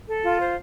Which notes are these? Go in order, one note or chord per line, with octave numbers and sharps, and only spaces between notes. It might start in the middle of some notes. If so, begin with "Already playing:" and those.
A4
F4
C5